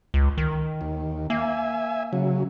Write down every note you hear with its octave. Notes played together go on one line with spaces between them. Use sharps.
C#2
D#3
D#2
A#3 E5 G#5
C#3 F#3